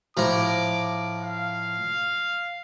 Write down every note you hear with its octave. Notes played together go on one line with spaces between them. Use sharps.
A2 F3 A#5 D6
F5